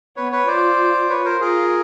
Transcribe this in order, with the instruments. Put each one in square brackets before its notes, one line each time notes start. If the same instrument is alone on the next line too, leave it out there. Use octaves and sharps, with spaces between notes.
[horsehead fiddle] B3 [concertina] B4 C#5
[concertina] B4 C#5
[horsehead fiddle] F4 [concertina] C5 D5
[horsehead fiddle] F4 [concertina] B4 C#5
[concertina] A#4 C5
[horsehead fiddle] F4 [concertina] G#4 A#4